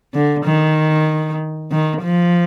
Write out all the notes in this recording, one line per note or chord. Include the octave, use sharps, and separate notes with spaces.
D3
D#3
D#3
F3